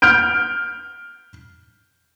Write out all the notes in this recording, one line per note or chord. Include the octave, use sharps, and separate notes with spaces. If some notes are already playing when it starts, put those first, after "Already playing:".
F6 G6 D7